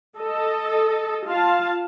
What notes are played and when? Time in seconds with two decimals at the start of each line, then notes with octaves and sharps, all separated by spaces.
0.17 A4 D#5
1.25 F4 F5 A5